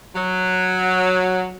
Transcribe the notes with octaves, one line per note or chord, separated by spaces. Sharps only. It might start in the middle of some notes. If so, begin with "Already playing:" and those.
F#3